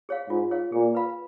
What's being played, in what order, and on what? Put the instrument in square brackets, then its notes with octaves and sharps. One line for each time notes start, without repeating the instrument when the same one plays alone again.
[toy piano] G#4 C#5 F5
[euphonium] G#2 [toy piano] F4
[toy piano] G#4 C#5 F5
[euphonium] A#2 [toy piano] G#4
[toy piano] B4 F5 B5